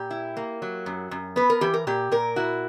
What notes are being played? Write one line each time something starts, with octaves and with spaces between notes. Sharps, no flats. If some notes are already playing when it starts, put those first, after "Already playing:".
Already playing: A#2 G4
E4
A#3
F#3
F#2
F#2
B3 B4
A#4
E3 G4
A#4
A#2 G4
A#2 A#4
E4 F#4